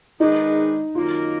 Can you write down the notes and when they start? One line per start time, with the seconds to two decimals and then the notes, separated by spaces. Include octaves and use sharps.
0.20 D#3 G#3 D4 D#4 G#4 B4
0.95 F#2 D#3 A#3 D#4 F4 A#4